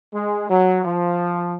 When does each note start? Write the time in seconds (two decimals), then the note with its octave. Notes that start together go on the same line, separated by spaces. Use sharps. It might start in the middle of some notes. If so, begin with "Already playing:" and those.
0.14 G#3
0.49 F#3
0.84 F3